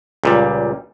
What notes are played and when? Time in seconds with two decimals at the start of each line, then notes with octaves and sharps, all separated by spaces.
0.24 C#2 A#2 G3